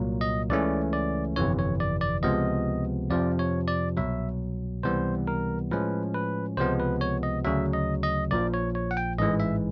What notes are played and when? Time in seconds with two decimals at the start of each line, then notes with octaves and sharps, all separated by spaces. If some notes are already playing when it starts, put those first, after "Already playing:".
Already playing: C2 A#2 F#3 A#3
0.21 D#5
0.50 C#2 C#3 E3 A3 C#4 D5
0.93 D5
1.36 G1 F2 C3 E3 C#5
1.59 C#5
1.80 D5
2.01 D5
2.23 C#2 C3 F3 G#3 B3 D#5
3.10 F2 C3 F3 D5
3.39 C#5
3.68 D5
3.97 C2 B2 F#3 E5
4.83 C#2 C3 E3 G3 B3 C5
5.27 A#4
5.71 A2 F3 G#3 C#4 B4
6.15 B4
6.57 C#2 C3 F3 G#3 B3 C5
6.80 B4
7.01 C#5
7.23 D#5
7.45 D2 C#3 F#3 E5
7.73 D#5
8.03 D#5
8.31 A#1 A#2 F3 D5
8.54 C#5
8.75 C#5
8.91 F#5
8.97 G5
9.18 A1 G#2 E3 G#3 D#5
9.40 E5